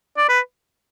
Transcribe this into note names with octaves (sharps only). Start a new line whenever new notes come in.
D5
B4